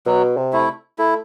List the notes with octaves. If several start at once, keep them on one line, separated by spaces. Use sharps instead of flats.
B2 F#3
C3
A3 E4
A3 E4